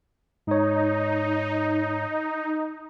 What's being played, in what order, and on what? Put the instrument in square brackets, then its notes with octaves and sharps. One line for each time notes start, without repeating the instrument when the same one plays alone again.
[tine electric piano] G#2 C#5 [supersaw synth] D#4